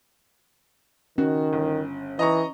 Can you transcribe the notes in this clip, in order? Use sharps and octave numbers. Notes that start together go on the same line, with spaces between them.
D#3 C#4 F#4
G1
E3 D#5 A#5 C#6